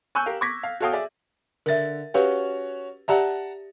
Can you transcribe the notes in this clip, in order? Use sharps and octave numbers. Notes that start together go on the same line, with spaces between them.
G#5 C#6 E6 F#6 G6
G4 A#4 F5
C#6 D6 G#6 A#6 B6
F5
F#4 A4 C#5 F5 G5 D#6
G#4 D5 E5
D3 A#4 E5 A6
C#4 F#4 G4 B4 C#5 F5
G4 D5 E5 F#5 A5 A#5